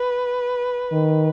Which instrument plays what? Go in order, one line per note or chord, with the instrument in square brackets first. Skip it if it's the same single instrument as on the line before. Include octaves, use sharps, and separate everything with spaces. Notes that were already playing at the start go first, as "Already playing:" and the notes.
Already playing: [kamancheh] B4
[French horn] D#3